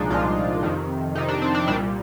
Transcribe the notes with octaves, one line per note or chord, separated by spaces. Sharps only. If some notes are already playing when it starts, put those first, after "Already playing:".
Already playing: C2 A#2 F3 G#3 D4 D#4
C2 A#2 F3 G#3 F4
F2 C3 D#3
F2 C3 D#3 D#4
D4
C4
D4
C2 A#2 G3 D4